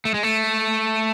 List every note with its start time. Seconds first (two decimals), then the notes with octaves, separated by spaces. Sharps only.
0.05 A3
0.14 G#3
0.23 A3